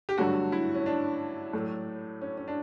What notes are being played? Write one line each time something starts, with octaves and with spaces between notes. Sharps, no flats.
G4
G2 D3 F#3 A3 F#4
E4
C#4
D4
A2 F#3 A3
C#4
C#4
D4